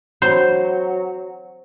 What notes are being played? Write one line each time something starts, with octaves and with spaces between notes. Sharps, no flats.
F#3 C4 C5